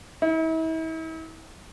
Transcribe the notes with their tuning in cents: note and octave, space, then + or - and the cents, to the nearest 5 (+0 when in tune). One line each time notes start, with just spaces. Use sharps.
E4 -40